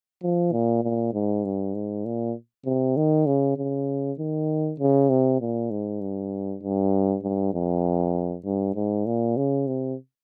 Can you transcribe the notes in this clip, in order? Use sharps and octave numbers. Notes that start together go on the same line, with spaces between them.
F3
A#2
A#2
G#2
G2
G#2
A#2
C3
D#3
C#3
C#3
D#3
C#3
C3
A#2
G#2
G2
G2
G2
F2
G2
G#2
A#2
C#3
C3